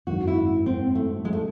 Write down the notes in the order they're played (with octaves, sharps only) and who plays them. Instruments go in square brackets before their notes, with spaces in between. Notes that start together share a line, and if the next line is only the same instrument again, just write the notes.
[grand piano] G#1 F#2 D#3 [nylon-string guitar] F#4
[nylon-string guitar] E4
C4
A3
G#3
A3